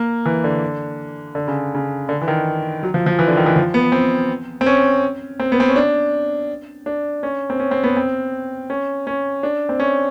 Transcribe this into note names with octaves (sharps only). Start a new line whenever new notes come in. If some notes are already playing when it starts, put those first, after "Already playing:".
Already playing: A#3
E3
D3
D3
C#3
C#3
D3
E3
D#3
F#3
F3
F3
E3
D3
D#3
E3
F3
B3
C4
C4
C#4
C4
B3
C4
C#4
D4
D4
C#4
C4
C#4
C4
B3
C4
C#4
C#4
D4
C4
C#4